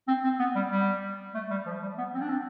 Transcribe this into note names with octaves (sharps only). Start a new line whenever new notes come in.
C4
C4
B3
G3
G3
A3
G3
F3
G3
B3
C4
D4
C4